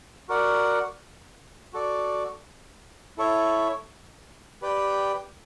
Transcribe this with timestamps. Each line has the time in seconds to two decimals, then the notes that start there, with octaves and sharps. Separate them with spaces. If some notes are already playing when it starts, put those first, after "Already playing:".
0.29 F#4 A#4 D5 F#5
1.73 F#4 A4 D5
3.17 E4 A4 C#5 E5
4.62 G4 B4 D5 G5